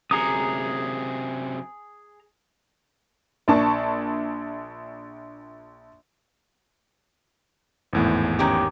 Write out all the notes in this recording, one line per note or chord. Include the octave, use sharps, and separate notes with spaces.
F#2 C3 G#4 A#5 D#6
A#1 D4 A5 C#6
G#1 E2 A2
D#3 C#4 G4